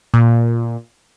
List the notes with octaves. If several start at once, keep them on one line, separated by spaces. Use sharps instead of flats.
A#2